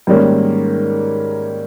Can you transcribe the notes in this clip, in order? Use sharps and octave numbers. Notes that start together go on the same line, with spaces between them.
G#2 D#3 G3 A#3 C#4